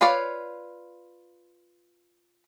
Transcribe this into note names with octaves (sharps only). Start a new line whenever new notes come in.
F4 B4 C#5 D5 F5